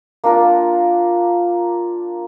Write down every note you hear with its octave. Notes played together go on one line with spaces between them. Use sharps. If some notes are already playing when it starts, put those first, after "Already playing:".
A#3 D4 F4 A#4